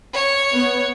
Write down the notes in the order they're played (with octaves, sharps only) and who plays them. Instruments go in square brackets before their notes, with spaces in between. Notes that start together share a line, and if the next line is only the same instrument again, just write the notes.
[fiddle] C#5
[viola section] B3